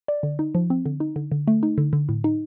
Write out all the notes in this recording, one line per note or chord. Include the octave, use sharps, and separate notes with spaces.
D5
D3
D#4
F3
C4
D3
D#4
D3
D3
A3
D#4
D3
D3
A2
D#4